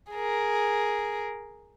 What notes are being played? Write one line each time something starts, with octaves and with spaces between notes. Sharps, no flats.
G#4 A#4